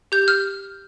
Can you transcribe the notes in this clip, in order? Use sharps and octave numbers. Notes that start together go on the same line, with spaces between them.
G4 G6
F6